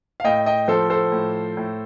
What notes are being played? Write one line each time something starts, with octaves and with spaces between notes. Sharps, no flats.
F5
A2 D#5 G5
D#5 G5
F3 A4 C5
A4 C5
A2
A2